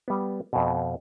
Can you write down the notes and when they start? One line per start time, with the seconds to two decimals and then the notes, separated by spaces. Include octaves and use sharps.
0.08 G3 B3
0.53 F2 B2